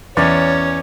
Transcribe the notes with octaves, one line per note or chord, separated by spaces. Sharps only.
E2 C#4 C#5 D5